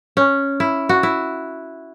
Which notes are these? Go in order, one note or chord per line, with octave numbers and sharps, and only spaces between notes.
C#4
E4
F#4
E4